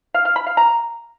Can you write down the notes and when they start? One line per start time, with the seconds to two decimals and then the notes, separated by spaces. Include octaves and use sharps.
0.14 F5
0.25 F5
0.36 B5
0.47 F5
0.57 A#5